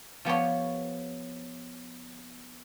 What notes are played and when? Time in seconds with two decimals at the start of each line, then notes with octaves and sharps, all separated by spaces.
0.25 F3 B3 G4 C#5